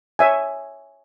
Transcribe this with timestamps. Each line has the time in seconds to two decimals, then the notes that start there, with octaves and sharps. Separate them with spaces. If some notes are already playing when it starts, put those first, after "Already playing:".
0.19 C#5 E5 G#5